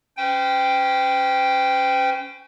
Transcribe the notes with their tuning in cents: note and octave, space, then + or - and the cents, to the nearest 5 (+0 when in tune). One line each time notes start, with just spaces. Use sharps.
C#4 +0 C5 -40 G5 +0